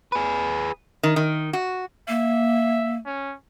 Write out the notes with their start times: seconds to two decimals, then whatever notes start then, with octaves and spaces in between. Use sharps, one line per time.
0.12 G#4 B4
1.03 D#3
1.16 D#3
1.53 F#4
2.08 A#3 E5
3.06 C#4